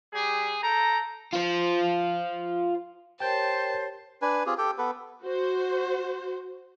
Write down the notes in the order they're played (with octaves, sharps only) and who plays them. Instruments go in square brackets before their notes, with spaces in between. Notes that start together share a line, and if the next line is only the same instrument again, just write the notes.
[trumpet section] G3 G4 G#4
A4 G5 A#5
[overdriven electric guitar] F4 C5
[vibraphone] G4 A#4 C#5 [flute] C5 [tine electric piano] G5 G6 [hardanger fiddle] A5
[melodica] D4 B4 G#5
C4 F4 G4 G#4
G4 A4 G5
B3 A4 B4
[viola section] F#4 C5